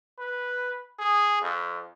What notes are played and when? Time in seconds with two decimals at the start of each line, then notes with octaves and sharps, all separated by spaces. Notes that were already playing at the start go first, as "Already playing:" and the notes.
0.19 B4
0.99 G#4
1.42 F2